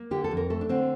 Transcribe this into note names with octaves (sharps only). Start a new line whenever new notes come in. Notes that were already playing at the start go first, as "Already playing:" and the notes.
Already playing: A#3
D3 G4
A4
F2
A#4
A3 A4
D4
D3 C4